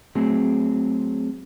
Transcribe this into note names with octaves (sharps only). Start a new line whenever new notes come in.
F#3 A3 C4 G#4